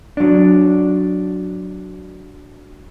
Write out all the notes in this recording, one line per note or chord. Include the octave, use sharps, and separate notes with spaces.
F#3 D4